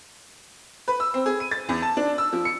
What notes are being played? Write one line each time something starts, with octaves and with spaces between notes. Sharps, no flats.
B4
E6
C4
G#4
D#7
A6
E2
A5
D4
E6
F3
C#7